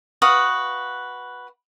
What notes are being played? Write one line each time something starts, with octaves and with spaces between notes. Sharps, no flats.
F#4 B4 F5 D#6